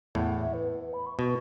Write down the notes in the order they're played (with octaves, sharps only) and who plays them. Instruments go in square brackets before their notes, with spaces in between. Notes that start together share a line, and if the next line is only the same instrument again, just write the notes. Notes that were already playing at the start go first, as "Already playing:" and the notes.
[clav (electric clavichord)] E2 A2 [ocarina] F#5
[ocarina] E5
B4
B4
B5
C#6
[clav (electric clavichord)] B2 [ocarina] C#6